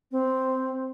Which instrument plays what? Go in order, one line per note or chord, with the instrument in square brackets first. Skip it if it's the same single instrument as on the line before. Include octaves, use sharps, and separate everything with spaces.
[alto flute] C4